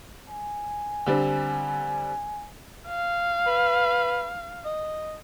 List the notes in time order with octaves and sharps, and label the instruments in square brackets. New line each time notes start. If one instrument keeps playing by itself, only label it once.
[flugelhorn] G#5
[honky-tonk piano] D3 G3 C4
[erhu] F5
[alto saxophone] B4
D#5